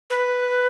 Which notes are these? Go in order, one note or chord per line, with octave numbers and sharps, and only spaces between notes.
B4